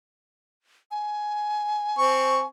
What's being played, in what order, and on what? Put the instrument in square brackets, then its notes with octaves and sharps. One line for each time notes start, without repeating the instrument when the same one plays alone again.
[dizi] G#5
[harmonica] C4 C#6